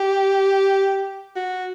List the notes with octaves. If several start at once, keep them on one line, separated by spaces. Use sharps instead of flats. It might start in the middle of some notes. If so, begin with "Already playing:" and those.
Already playing: G4
F#4